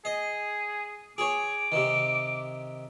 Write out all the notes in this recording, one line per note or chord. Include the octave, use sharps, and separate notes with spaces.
G#4 D#5
G#4 C#5 D6
C3 D#3